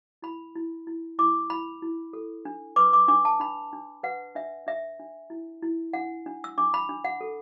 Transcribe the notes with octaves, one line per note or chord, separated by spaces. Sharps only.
E4 B5
E4
E4
E4 D6
E4 B5
E4
A4
D4
B4 D6
D6
D4 D6
A5
D4 B5
D4
B4 F#5
D4 E5
D4 E5
D4
E4
E4
D4 F#5
D4
E6
D4 D6
B5
D4
F#5
A4